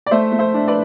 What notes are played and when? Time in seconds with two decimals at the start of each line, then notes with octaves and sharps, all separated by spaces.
0.06 D5
0.11 A3 C5 E5
0.32 A3
0.39 C5 E5
0.54 D4
0.68 B4 D5